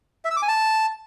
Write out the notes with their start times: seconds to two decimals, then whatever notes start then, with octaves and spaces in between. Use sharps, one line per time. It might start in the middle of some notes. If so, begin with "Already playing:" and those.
0.25 E5
0.31 E6
0.36 D6
0.42 G#5
0.48 A5